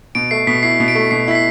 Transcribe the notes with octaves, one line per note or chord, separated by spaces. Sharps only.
B2 D7
A3 C7
B2 B6
E4 C7
B2
D7
A3
B2 C7
E4 B6
C7